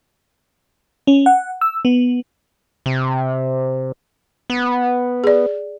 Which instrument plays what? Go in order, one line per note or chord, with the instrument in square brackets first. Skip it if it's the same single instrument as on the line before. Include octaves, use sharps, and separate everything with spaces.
[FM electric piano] C#4
F#5
E6
B3
[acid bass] C3
B3
[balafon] G#4 D5